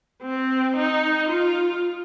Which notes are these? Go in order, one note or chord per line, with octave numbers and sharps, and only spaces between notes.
C4
D#4
F4